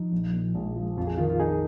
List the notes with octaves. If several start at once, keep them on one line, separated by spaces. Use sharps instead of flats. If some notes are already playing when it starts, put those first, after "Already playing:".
Already playing: F3 D#4
A#1
A#2
A#1 G#3
F3
F2 F4
G#4
D#3 F4
F4
D#4 G#4